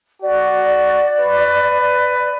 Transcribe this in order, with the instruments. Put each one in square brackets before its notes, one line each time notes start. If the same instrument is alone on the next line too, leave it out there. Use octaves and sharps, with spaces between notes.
[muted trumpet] F#4 [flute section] D5
[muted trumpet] B4